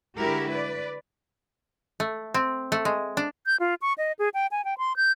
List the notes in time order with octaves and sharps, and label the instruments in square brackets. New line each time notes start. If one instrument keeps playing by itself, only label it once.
[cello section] D3 G#3 E4 F#4 G4 A#4
B4 D5
[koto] A3
C4
A3
G#3
D4
[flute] G6
F4
C#6
D#5
G#4
G5
G#5
G5
C6
G6